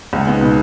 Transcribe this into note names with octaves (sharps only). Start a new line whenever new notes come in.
C#2
B3 D#4 G#4
B2